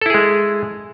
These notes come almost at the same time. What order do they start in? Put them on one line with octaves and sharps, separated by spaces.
A4 E4 G#4 G#3